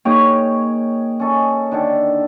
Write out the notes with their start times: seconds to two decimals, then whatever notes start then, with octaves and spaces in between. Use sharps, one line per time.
0.05 A#3 D#4 G#4 C#5 G5
1.20 C#4 A4 D#5
1.72 D3 D#3 A4